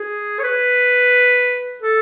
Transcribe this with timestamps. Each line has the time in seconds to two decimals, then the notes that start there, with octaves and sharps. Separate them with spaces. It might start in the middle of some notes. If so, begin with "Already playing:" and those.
Already playing: G#4
0.40 C#5
0.43 B4
1.82 A4